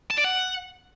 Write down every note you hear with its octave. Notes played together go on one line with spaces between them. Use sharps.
A5
D5
F#5